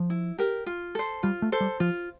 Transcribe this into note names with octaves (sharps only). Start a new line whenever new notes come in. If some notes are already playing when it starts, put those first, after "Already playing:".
Already playing: F3
E4
G4 A#4
F4
A4 C5
G3 F4
A3
A4 C5
G3
F3 F4